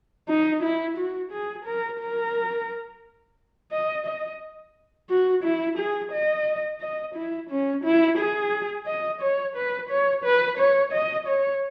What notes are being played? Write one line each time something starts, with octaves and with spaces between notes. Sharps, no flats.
D#4
E4
F#4
G#4
A#4
A#4
D#5
D#5
F#4
E4
G#4
D#5
D#5
E4
C#4
E4
G#4
D#5
C#5
B4
C#5
B4
C#5
D#5
C#5